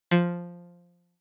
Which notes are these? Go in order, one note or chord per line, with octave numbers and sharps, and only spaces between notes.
F3